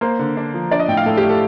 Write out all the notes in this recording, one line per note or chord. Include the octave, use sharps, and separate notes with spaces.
A#3 C5
D3
D4
F3
D4 D5
D#5
A2 G5
F5
A2 A4
G4
A3
A4